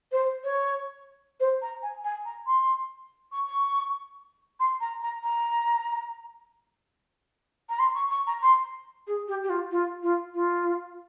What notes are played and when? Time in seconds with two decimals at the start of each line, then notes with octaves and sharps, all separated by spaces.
0.12 C5
0.44 C#5
1.40 C5
1.62 A#5
1.83 G#5
2.04 G#5
2.25 A#5
2.47 C6
3.32 C#6
3.47 C#6
4.60 C6
4.81 A#5
5.03 A#5
5.23 A#5
7.70 A#5
7.79 C6
7.95 C#6
8.11 C#6
8.27 A#5
8.42 C6
9.07 G#4
9.28 G4
9.44 G4
9.50 F4
9.71 F4
10.03 F4
10.35 F4